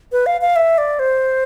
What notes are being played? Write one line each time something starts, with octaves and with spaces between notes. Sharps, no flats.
B4
F5
F5
E5
D5
C5